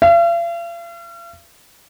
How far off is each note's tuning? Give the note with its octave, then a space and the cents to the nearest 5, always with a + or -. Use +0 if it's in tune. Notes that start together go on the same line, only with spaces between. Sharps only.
F5 -45